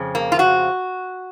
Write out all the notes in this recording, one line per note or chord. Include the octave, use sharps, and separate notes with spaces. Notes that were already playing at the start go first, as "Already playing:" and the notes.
Already playing: F2 C#3 F3
A#3
F4
F#4